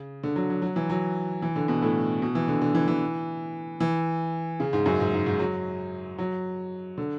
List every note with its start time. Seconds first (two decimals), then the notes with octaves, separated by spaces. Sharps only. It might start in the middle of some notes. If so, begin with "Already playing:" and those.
Already playing: C#3
0.23 D3
0.36 F#3
0.50 F#3
0.62 F#3
0.76 E3
0.90 F#3
1.42 E3
1.56 D3
1.68 B2
1.82 A2
2.22 B2
2.35 E3
2.48 D3
2.62 D3
2.75 E3
2.88 E3
3.80 E3
4.60 C#3
4.73 G#2
4.86 F#2
5.00 G#2
5.13 G#2
5.26 G#2
5.39 F#3
6.18 F#3
6.98 D3